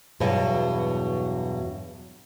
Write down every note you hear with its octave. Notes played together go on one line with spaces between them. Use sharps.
E2 G2 B2 F#3